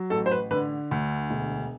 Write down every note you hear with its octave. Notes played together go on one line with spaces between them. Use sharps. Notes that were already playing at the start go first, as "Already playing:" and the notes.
Already playing: F#3
A1 A4
C5
B4
D3 B4
D2
E1